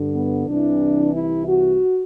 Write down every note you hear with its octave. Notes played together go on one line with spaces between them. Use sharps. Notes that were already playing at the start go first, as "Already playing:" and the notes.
Already playing: G2 D3
B3
C2 C3 E3 D4
E4
F#4